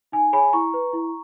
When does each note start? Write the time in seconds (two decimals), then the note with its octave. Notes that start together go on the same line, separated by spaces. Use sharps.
0.12 D#4 G#5
0.33 G#4 C#5 G#5 B5
0.53 E4 A#5 C#6
0.74 B4
0.93 E4